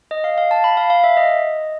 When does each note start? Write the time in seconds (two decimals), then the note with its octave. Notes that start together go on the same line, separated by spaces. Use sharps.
0.11 D#5
0.24 F5
0.38 F5
0.51 A5
0.64 B5
0.77 F5
0.90 F5
1.04 E5
1.17 D#5